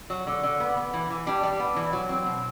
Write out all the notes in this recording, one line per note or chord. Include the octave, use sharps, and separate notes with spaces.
F#3
D3
D3
B3
B3
E3
E3
G3 D4
G3
B3
E3
F#3
C4
B2